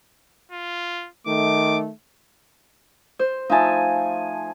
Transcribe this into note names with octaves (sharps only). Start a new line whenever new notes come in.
F4
D#3 A3 D6
C5
F3 A3 D#4 E5 G#5 A5